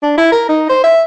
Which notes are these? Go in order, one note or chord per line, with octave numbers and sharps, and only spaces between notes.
D4
E4
A#4
D#4
C5
E5